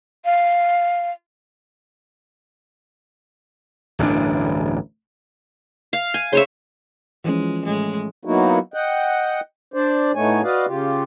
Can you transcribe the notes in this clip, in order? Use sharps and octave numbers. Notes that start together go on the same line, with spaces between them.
F5
D1 A1 G2 D4
F5
G#5
C#3 C5 C#5 E5
E3 F3 G#3 C#4
A2 G#3
F#3 A#3 B3 D#4 E4 F#4
D#5 F#5 G5
D4 C5 D5
A2 A3 B3 D#4 C#5 G#5
F#4 B4 D5 D#5 F5
C#3 F4 G4